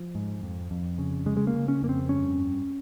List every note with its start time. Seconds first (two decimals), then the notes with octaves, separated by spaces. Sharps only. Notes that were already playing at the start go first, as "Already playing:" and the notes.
Already playing: F3
0.15 G#2
0.43 F2
0.71 F2
0.98 C#3
1.26 C#3 G#3
1.37 G#3
1.47 A#3
1.54 C#3
1.68 C#4
1.82 F2 A#3
1.89 C4
2.09 G2 C#4
2.38 G2